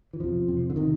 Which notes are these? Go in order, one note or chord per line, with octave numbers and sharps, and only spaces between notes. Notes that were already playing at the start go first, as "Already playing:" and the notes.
E3
E2 C3 F3
E2 C3
D3
C3 D#3